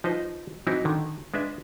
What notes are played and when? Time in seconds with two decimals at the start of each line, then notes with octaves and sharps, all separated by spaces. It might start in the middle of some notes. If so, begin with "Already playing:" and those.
0.04 F3 D#4 B4 C5 D#5
0.67 E3 F#3 C4 D#4 E4 F#4
0.85 D3 D#3
1.34 G#3 D4 B4 E5